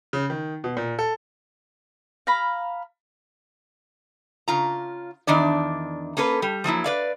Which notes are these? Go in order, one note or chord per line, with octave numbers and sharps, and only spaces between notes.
C#3
D#3
B2
A#2
A4
F5 A#5 B5
C#3 F4 A#5
E2 D#3 D4 D5
A#3 C#4 A4 B4
G3
F3 F#3 A#3 E4
B4 D5 F5